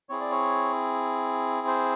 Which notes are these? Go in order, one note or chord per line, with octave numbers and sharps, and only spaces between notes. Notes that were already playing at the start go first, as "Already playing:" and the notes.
C4 E4 G#4 C#5
D5
C#5
C5